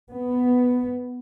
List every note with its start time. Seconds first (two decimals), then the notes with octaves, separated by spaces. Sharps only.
0.14 B3